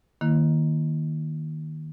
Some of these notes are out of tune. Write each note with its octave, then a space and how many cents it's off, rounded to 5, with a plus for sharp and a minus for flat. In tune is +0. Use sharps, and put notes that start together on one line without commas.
D#3 -5 A#3 +0 E4 +0